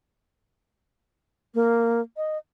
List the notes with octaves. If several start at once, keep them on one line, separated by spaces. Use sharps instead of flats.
A#3
D#5